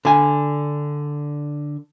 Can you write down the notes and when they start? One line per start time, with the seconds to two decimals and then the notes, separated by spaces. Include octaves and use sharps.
0.05 D3 G#5